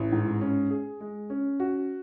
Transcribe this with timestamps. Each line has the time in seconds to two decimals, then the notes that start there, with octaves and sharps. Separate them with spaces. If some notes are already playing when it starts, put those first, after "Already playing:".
Already playing: A1
0.12 G#2
0.41 C#4
0.70 G#4
1.00 G#3
1.30 C#4
1.60 F#4